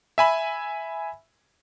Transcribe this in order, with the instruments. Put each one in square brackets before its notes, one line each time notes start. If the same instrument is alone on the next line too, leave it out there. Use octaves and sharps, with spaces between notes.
[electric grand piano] E5 G#5 B5